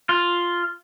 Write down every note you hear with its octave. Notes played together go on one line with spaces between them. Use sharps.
F4